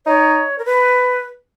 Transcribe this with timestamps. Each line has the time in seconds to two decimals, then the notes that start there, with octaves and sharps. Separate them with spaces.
0.06 D#4 C#5
0.58 A#4
0.65 B4